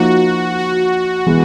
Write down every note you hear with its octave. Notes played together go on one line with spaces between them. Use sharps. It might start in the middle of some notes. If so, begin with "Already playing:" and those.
Already playing: F3 A#3 D#4 F#4
F#4
E3 G#3 B3